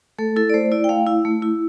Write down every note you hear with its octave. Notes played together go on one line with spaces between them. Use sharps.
A3 A4
E4 A4
D5
A3 C5
E4 D5
G5
A3 F5
E4
A3
E4